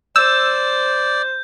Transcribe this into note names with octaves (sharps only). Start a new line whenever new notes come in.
C5 D5 E6 G6